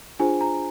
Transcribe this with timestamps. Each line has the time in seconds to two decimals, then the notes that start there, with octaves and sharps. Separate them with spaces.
0.20 D4 F4 G#4 C5 G#5
0.41 A#5